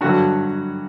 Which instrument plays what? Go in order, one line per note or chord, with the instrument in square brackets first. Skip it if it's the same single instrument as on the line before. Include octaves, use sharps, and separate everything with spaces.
[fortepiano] G2 D3 F#3 F#4